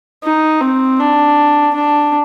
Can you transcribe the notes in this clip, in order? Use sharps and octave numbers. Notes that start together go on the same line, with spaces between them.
D#4
C4
D4
D4